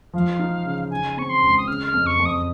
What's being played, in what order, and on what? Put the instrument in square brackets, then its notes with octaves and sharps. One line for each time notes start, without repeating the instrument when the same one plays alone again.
[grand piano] F3 [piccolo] F5
[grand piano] D#4
C#3
[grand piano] C#3 [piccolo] G#5
[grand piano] C4 [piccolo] C#6
[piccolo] C6
[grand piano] C#2
[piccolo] D#6
[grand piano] C#3 [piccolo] F6
[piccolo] F6
[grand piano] F2
[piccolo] C#6
[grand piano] F2
[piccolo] D#6